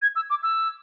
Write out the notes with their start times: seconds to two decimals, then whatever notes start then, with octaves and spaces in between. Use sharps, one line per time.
0.02 G#6
0.16 E6
0.30 D6
0.43 E6